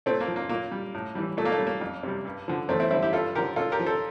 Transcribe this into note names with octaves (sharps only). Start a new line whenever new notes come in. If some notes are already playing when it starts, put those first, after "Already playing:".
A#2 A3 C4
A#3
F3
A#3
A#2 A#3
G3
A2
E3 G3
A#2 A3
A#3
A3
G3
A#3
F2
C3 G3
G2
D3 F3
E2 A3 C4
C4 E4
D3 G3 C4 E4
E4 G4
G2 F4 A4
D3 F3 G4 A#4
A#2 F4 A4
G4 A#4
F3
A4 C5